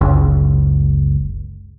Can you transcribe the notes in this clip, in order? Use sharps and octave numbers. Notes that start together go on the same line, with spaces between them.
F#1 C#2